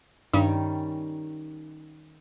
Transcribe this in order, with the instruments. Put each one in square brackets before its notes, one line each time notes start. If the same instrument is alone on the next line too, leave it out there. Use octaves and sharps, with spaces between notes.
[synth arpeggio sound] G2 [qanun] D#3 G3 C#4